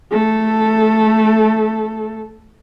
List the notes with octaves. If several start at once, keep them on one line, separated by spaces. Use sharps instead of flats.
A3 A4